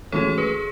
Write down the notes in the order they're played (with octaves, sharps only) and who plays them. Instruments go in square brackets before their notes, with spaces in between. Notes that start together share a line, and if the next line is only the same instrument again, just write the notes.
[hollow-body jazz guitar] A2 E3 G#3 C#4 F#4 [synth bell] A4 C#5
[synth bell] G#4 B4